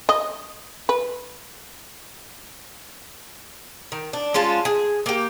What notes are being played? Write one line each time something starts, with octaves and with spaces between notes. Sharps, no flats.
D#5
B4
D#3
D4
G#3 C#4 F4 A5
G#4
A#3 G4